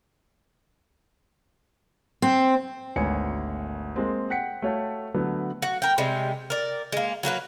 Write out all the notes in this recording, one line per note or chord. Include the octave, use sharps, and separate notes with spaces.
C4
G#1 D2 B3 C#5 G#5 C#7
G#3 A#3 C4
F#5 G5 B6 C#7
A3 F#4 C#5 F5 G5 A5
D3 F#3 A3 B3
F#4
A#4 G5
C3 G3 G#3
A#4 D5
G#3 A#3
F#3 A#3 D#4 B4